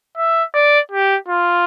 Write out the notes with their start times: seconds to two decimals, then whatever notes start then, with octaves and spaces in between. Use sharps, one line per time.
0.18 E5
0.54 D5
0.91 G4
1.28 F4